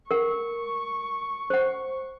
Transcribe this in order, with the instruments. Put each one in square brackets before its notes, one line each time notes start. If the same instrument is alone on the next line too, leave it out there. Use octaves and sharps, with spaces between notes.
[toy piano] A#4 F#5 [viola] C#6
[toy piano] C5 F#5